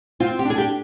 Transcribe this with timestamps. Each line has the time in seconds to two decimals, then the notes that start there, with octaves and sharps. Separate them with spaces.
0.20 C4 F4
0.39 G4
0.45 D4
0.50 G#4
0.58 G4